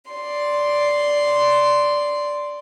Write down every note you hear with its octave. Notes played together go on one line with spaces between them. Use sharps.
D5 C6